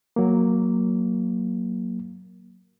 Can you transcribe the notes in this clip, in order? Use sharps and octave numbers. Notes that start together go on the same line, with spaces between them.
F#3 A#3